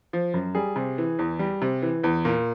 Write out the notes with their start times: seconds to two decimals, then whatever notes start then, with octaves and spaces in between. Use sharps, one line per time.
0.13 F3
0.34 F#2
0.55 G3 G#4
0.76 C3
0.98 E3
1.19 E2
1.39 G3
1.62 C3
1.82 E3
2.04 E2
2.25 A#2